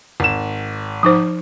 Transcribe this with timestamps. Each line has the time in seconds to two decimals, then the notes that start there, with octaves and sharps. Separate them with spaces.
0.20 G#1 E7
1.03 F3 D#4 C5